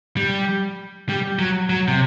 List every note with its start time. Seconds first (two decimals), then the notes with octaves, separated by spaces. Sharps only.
0.17 G3
1.09 G3
1.39 F#3
1.70 F#3
1.88 C3